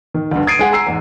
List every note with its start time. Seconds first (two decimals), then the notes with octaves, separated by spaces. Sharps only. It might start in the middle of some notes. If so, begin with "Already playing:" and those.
0.14 D#3
0.31 D2 G2
0.47 D#6 G#6 A6 C7 D7 D#7
0.59 G#3 G#4 F#5
0.72 A#5 E6 C7
0.87 E2 G#2